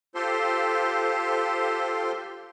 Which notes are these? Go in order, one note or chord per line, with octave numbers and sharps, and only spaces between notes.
F4 G4 A4 C5 C6